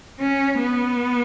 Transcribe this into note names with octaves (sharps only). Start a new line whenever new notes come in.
C#4
B3